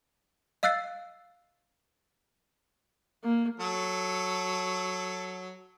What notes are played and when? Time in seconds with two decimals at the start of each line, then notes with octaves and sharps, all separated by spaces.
0.63 D#5 F5 E6 F#6 A6 C7
3.24 A#3
3.60 F#3 A4